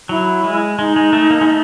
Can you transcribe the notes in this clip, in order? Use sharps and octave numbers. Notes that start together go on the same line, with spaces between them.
F#3 E4
G#3
G#3 D#4
G#3
A3
A#3
G#3
A3